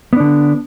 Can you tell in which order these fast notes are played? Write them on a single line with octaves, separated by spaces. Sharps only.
B3 D4 D3